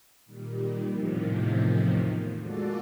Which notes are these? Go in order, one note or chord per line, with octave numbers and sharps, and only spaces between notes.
A#2 D#3 G3
E2 A2 C3 D#3 F3
G#3 A#3 F4 F#4 A4 D5